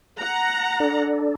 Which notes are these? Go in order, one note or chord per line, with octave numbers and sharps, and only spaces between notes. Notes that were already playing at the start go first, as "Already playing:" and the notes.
F#5 A#5
D4 A4 D5